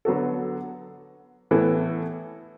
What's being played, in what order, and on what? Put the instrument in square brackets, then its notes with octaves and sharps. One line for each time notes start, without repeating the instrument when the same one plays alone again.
[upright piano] D3 F#3 B3 F#4 A4
A2 E3 B3 E4 A4